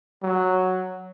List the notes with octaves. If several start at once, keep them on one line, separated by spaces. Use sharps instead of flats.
F#3